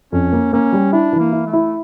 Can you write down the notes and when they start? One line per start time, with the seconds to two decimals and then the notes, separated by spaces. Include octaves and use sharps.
0.12 F2 C#4
0.32 A#3
0.53 A#3 C#4
0.73 G3
0.92 D4 E4
1.13 E3
1.19 A#3
1.32 E4
1.47 A3
1.53 E4